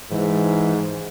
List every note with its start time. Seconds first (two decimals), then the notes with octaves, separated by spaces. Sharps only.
0.11 G#2 E3